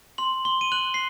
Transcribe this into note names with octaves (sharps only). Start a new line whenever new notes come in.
C6 F#7
C6 G7
D#7
F#6 F#7
C7